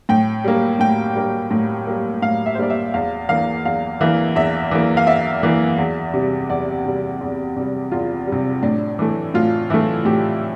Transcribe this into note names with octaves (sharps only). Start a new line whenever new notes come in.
A2 G5
G3 A#3
A2 G5
G3 A#3
A2
G3 A#3
A2 F5
E5
C5
G3 A#3 D5
E5
E2 F5
E3 A#3 F5
E2 F5
E3 A#3 E5
E2 E5
E3 A#3
F5
E2 E5
E3 A#3
E2
C3 G3
E2 D5
C3 G3
E2
C3 G3
E2 F4
C3 G3
A2 D4
E3 A3
A2 F4
E3 A3 E4
A2 G4